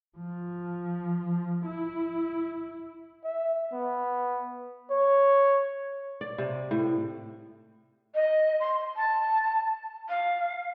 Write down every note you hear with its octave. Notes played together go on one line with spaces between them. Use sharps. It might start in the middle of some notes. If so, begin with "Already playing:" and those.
F3
E4
E5
B3
C#5
D5
C3
A2
D#5
C6
A5
F5